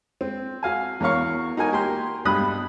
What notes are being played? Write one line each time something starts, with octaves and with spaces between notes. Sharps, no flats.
C4
F#4 F5 G#5
E2 A#4 C#5 F5 C#6
D#4 F#4 A#4 G#5
A#3 G4 A#4 G5 C6
G2 B2 G3 B5 D#6 F#6